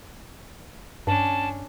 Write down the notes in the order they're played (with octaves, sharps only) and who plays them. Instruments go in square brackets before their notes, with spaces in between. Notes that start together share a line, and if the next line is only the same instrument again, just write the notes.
[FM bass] G2 [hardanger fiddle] C#4 D4 [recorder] A5